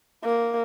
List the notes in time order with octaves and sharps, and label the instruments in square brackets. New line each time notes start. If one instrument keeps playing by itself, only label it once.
[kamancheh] A#3